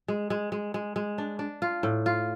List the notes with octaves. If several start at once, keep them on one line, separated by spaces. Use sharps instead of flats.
G#3
G#3
G#3
G#3
G#3
D4
D4
F4
A2
F4